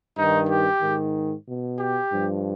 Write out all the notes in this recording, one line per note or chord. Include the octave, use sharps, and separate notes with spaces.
G2 D#3 D#4
G4
G#2 D#3
B2
G4
G2 F3